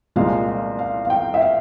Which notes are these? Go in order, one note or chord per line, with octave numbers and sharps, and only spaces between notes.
C2 A#2 F3 G#3 F5
F5
F5
F5
G5
E5
F5